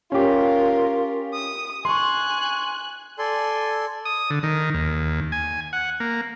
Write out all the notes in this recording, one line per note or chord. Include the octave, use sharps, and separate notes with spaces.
C#4 F4 G4 A#4
D#6
G#5 C6 C#6 F#6
A4 D5 G#5 C6
D#6
D3
D#3
D#2
G#5
F#5
A#3